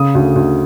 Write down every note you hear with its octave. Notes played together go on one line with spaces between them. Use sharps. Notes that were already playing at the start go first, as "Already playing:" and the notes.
Already playing: C#3 D#6
D2
D2